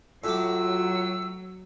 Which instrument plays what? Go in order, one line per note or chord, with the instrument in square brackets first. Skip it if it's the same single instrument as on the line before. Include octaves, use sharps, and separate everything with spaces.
[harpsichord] A2 D6 [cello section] F#3 [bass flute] F4 [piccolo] E6